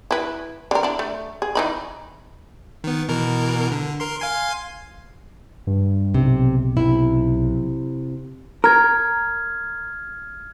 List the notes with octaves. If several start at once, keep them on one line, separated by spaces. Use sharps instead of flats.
E4 B4
D3 A#4
D4 E4
A3
G#4
E3 D#4 B5
D#3 B3
B2 E3 A#4
D3
A#4 C6
F5 G#5 C6
G2
B1 C3
C3 E4
A#4 F6 G#6